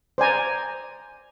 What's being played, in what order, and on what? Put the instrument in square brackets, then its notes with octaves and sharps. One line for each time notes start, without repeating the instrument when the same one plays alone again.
[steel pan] C5 D5 G#5 A#5